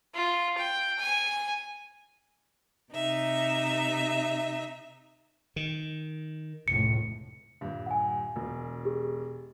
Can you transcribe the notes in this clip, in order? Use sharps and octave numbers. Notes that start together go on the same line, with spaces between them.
F4
G5
G#5
C3 D#4 E5
D#3
F1 C#2 A2 C#7
D#1 G2
F#5 G#5
E1
G4 G#4